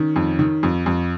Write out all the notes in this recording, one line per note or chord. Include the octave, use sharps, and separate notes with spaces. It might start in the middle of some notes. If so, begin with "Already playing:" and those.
Already playing: D#3 C#4
F2
D#3
F2
F2